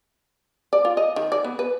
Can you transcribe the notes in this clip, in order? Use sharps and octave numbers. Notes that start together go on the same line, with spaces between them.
D5
F4
D#5
D#3
D5
B3
B4